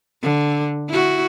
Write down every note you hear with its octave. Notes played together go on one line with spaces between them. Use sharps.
D3
E4 F#4